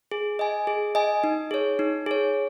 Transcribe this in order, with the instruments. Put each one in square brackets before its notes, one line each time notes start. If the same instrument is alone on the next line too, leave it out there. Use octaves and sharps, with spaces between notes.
[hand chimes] G#4
D#5 G#5
G#4
D#5 G#5
D#4
G#4 C#5
D#4
G#4 C#5